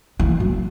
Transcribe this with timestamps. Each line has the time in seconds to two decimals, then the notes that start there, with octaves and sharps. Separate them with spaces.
0.20 E3
0.40 F#3